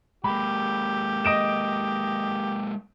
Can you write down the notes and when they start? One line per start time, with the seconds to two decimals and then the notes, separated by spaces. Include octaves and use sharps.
0.24 G#3 A#3 G4 B5
1.25 D#5 D7 E7